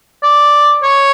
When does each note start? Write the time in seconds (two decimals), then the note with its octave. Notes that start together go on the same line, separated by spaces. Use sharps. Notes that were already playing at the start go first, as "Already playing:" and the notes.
0.23 D5
0.84 C#5